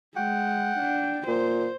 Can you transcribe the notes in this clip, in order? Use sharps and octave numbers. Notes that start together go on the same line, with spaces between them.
G#3 F#5 G5
D4
A#2 C5